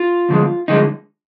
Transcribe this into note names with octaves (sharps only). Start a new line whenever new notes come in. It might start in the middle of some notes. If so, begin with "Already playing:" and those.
Already playing: F4
D#2 D3 F3 G#3
D3 F3 G#3 D#4